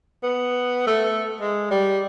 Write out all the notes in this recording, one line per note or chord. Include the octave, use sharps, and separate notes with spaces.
B3
A3
G#3
G3